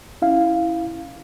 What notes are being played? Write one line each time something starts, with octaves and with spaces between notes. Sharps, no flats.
C#4 E4 F5